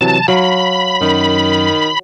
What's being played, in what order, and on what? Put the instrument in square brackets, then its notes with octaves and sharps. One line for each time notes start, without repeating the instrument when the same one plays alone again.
[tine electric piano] C3 E3 F#3 [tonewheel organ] A5
[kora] F#3 [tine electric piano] F5 [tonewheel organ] B5
[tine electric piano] F#2 [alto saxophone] D#3